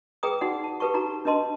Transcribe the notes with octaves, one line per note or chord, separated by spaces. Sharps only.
G#4 B4 G5 A#5 D#6
D#4 F#4 D5 F#5
A5
G4 A4 B4 A5 C#6
D#4 F#4 A#5
D4 B4 D#5 A5 C6